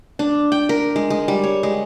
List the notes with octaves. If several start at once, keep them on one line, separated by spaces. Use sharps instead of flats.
D4
G5
A#4
G#3
G#3
G3
C#5
G#3